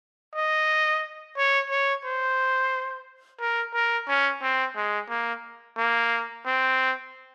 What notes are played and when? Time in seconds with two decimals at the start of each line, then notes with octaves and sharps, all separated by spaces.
0.35 D#5
1.37 C#5
1.70 C#5
2.05 C5
3.40 A#4
3.74 A#4
4.08 C#4
4.42 C4
4.76 G#3
5.09 A#3
5.77 A#3
6.46 C4